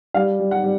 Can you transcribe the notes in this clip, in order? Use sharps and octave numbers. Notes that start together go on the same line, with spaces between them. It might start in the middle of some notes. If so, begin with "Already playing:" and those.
G3 F5
G3
F#5
G3